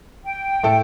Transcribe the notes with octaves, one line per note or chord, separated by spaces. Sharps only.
G5
A2 A3 E4 A4